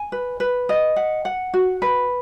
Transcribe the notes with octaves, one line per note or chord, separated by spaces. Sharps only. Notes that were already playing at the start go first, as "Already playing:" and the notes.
Already playing: G#5
B4
B4
D#5
F#5
F#5
F#4
B4